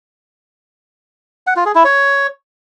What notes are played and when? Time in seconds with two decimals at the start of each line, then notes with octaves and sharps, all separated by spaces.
1.47 F#5
1.56 F4
1.66 G#4
1.75 E4
1.84 C#5